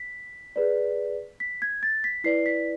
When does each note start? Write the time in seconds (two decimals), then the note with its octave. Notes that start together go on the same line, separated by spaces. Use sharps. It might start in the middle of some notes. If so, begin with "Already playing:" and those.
Already playing: B6
0.56 G#4 B4 D5
1.40 B6
1.62 G#6
1.83 A6
2.04 B6
2.24 E4 B4 D5 C7
2.46 B6